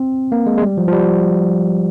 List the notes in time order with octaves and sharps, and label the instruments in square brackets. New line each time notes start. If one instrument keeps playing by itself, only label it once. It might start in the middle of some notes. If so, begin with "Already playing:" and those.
Already playing: [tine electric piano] C4
A#3
G#3
G#3
G3
F3
F3
G3